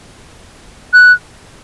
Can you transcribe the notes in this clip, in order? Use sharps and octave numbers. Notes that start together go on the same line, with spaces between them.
F#6